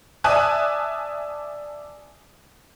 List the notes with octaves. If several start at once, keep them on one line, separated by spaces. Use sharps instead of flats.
D5 E5 G#5 A5 D#6 F#6